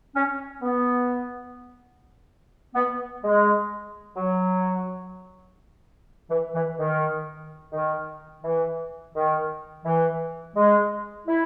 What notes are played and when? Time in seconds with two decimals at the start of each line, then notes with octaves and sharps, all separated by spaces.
0.15 C#4
0.62 B3
2.75 B3
3.23 G#3
4.17 F#3
6.30 E3
6.54 E3
6.78 D#3
7.72 D#3
8.44 E3
9.14 D#3
9.85 E3
10.56 G#3
11.27 E4